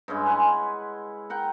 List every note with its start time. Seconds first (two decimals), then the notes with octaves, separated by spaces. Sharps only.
0.08 G2 G#3 C#4 E4
0.27 B4 F#5 G#5 C6
1.30 A#4 F#5 G5